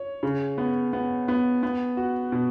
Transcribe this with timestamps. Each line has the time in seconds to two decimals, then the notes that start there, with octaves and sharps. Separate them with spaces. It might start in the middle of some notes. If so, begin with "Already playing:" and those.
Already playing: C#5
0.23 C#3
0.58 B3
0.93 B3
1.28 B3
1.63 B3
1.97 F#4
2.32 B2